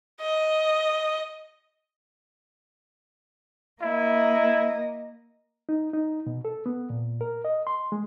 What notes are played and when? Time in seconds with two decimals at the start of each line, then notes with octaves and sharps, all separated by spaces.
0.21 D#5
3.82 A#3 E4 D#5
5.69 D#4
5.93 D#4
6.27 B2
6.45 A4
6.66 B3
6.90 A#2
7.21 A#4
7.45 D#5
7.67 C6
7.92 G#3